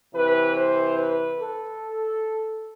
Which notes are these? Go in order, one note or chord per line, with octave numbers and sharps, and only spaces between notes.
C3 E3 B4
C5
B4
A4